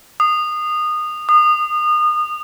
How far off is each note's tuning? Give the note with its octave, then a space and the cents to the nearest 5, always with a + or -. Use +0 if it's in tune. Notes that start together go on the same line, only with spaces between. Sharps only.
D#6 -20
D#6 -30